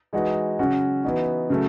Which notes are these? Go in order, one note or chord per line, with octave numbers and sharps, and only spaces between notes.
E3 G#3 D#4 F#4
C#3 F#3 C#4 F#4
E3 B3 D#4 F#4
C#3 F#3 A3